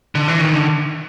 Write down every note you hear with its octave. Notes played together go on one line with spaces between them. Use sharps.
D3
E3
D#3
D3